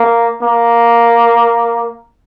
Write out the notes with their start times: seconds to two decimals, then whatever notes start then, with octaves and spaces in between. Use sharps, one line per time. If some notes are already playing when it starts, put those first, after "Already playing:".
Already playing: A#3
0.43 A#3